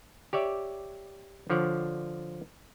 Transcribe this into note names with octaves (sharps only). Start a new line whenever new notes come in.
G4 C#5 D5 E5
D3 F3 C#5 D5 F#5